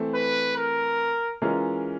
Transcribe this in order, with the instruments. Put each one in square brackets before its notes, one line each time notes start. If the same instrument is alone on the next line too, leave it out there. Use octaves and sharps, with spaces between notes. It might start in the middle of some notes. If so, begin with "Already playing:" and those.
Already playing: [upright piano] E3 A3 C4
[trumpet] B4
A#4
[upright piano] E3 G#3 C#4 F4 A#4